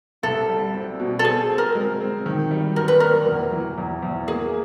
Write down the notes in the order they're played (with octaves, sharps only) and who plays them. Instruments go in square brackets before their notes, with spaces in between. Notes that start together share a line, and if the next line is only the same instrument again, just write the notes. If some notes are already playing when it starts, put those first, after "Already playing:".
[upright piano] C2 [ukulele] A4
[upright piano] G3
C4
B2
[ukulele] A4
[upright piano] C4 [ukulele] G#4
[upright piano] C4
[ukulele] A#4
[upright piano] G#3
C4
D#3
G3
[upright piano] F#2 [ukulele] A#4
[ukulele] B4
[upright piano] A#3 [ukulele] A#4
[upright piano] E2
E3
E2
E2
[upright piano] A#3 [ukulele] G#4